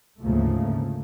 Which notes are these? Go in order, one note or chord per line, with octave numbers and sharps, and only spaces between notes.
D2 G#2 C#3 F3 A3 A#3